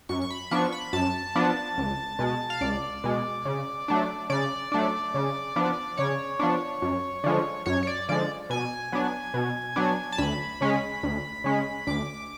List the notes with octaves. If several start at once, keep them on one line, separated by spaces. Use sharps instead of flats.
F#2 C#6
C#6
B5
F3 B3 D4 C#6
B5
F#2 A5
F3 B3 D4
C#2
B2 G#3
F5
C#2 D5
B2 G#3
C#3
F#3 A3 D4
C#3 D5
F#3 A3 D4
C#3
F3 B3 D4
C#3 C#5
F3 B3 D4
F#2
D3 F3 G#3
F#2 C#5
C#5
D5
D3 F3 G#3 D5
B2 G#5
F#3 B3 D4
B2
F#3 B3 D4
A5
D2 B5
C#3 G#3 C#4
D2
C#3 G#3 C#4
D2 D6